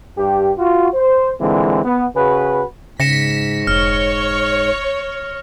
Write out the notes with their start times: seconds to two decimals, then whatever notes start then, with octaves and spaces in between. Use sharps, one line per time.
0.17 G2 G4
0.58 F4 F#4
0.94 C5
1.41 A#2 D3 E3 G#3 C4
1.85 B3
2.15 C#3 F#4 G#4 B4
3.00 G#2 C#3 A#6 B6 C#7 E7
3.67 F1 C#5 F6